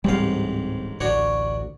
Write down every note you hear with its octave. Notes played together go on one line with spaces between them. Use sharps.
D1 A1 G#2 G3 C4 F5
A1 D2 D4 F#4 C#5